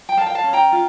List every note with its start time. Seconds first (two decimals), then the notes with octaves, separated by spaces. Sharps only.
0.09 G5
0.17 A#4 F5 A5
0.26 G5
0.35 F5 A5
0.44 C#4
0.53 G5 A#5
0.72 F4